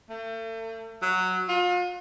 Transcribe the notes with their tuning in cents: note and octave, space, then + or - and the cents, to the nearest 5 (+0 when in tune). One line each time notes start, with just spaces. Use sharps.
A3 +40
F#3 +0
F4 +35